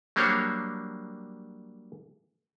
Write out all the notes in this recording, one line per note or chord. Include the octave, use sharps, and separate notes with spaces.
F#3 G3 A#3 D4 C5 C#5